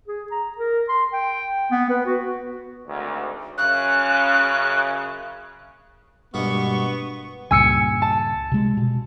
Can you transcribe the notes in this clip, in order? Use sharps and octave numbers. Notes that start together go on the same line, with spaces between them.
G#4
A#5
A#4
C6
G5
B3
B4
F#4
G#1 D2
F#2 C#3 F#6
G2 B2 G#3 A#3 B3 C#6
C#2 G2 A#2 G#5 E6 C#7
A5
C3 G#3
B2